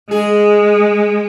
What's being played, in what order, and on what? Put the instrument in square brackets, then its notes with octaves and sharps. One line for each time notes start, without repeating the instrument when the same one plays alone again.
[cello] G#3 [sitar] G#4